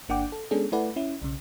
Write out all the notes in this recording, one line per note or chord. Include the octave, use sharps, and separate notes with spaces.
G1 A#3 D4 F#5 G5 D6
A4
G#3 B3 C#4 D4 G#4 A4
A3 E4 A4 B4 D5 F#5
C#4 E4
B1 C#3